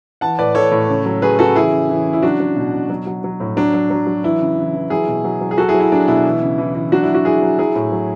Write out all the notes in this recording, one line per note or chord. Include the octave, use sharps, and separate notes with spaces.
E3 F#5 A5
A2 B4 D5
E3 A4 C#5
A2
C#3
F#3
F#3 G#4 B4
C#3 F#4 A4
E3 E4 G#4
C#3
E3
C#3
E4
F#3 D4 F#4
F#3
B2
B2
F#3
F#3
F#3
A2
F#3 D4
F#3
F#3
F#3
E3 E4
C#3
E3
E3
F#3 E4 G#4
B2
F#3
F#3
G#4
F#3 F#4 A4
E4 G#4
F#3
E4
F#3 D4
B2 E4
E3
C#3
E3
E3
F#3 D4 F#4
E4
F#3
D4 F#4
F#3 E4 G#4
F#3
F#3 E4 G#4
A2
F#3